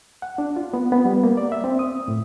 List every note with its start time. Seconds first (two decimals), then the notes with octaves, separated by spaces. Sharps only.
0.22 F#5
0.38 D4
0.56 F4
0.74 B3
0.92 B3
1.05 G3
1.23 A#3
1.37 D5
1.52 E5
1.64 C4
1.79 D#6
2.08 A2